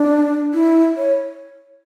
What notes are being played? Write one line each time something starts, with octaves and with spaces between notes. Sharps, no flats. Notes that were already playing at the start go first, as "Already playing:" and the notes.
Already playing: D4
E4
C#5